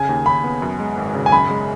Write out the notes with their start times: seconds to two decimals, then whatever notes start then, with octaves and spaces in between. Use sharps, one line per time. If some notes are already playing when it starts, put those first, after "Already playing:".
Already playing: C#3 G#5
0.09 D#2
0.26 D#2 B5
0.44 B3
0.62 F#2
0.80 G#3
0.97 G#1
1.15 C#3
1.26 G#5
1.32 F#2 B5
1.51 G#3